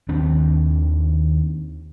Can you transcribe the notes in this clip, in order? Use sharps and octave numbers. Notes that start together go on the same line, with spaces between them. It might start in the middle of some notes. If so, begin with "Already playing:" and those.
D#2 D#3 C4 D4